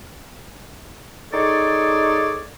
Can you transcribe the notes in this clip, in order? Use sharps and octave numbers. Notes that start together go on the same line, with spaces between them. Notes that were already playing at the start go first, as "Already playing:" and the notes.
D#4 G#4 A4 C#5 D5